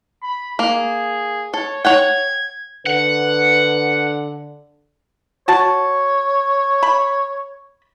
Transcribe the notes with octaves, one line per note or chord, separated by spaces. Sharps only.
B5
A#3 G#4
A4 C#5
C#5 F#5 G5 G#6
D3 B4 F#5
F#4 C#5 A5
B5